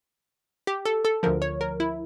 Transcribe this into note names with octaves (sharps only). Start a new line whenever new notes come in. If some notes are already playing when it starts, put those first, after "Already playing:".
G4
A4
A4
D2 D3 F3 A#4
C#5
A#4
E4